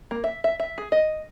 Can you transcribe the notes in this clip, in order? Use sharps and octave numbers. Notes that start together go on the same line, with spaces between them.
A#3
E5
E5
E5
G#4
D#5